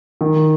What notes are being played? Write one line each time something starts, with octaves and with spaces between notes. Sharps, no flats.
D#3